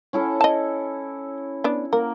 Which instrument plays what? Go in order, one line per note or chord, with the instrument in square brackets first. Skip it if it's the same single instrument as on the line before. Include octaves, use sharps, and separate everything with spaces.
[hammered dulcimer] C#4 E4 A4
[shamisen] D#5 A5
B3 D4
[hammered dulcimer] A#3 [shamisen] A#4